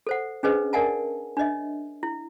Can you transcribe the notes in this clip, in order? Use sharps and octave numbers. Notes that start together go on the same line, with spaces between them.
A4 C5 F#5
C#4 D4 G#4 B4 C5 D#5
A#4 D5 E5 F#5 G#5 A5
D4 C#5 D#5 E5
E4